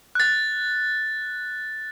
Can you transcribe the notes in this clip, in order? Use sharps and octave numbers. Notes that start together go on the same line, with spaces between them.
F#6 A6